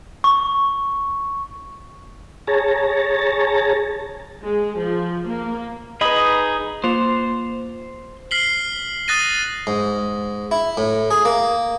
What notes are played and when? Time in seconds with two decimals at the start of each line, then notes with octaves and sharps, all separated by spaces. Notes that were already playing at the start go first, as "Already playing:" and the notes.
0.24 C#6
2.47 G#4 C#5 A5 A#5
4.43 G#3
4.79 F3
5.27 A#3
6.01 D#4 G#4 B4 D#5 B5
6.84 A#3 F4 C5 F7
8.31 F6 B6 C7 F#7 G7
9.08 D#6 F#6 A6 A#6 D#7
9.67 G#2
10.51 E4
10.77 A2
11.11 G#4
11.25 A#3